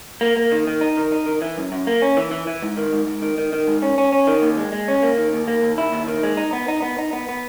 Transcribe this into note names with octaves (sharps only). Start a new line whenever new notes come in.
A#3
A#3
D#3
D#3
D#4
D#3
D#4
D#3
E3
F#2
F#2
A#3
C#4
E3
E3
E3
G#2
D#3
G#2
G#2
D#3
D#3
D#3
G#2
C#4
C#4
C#4
D#3
D#2
G#3
G#3
C#4
A#3
D#3
D#2
A#3
D#2
E4
D#2
D#3
G#3
D#4
B3
D#4
B3
D#4
B3
B3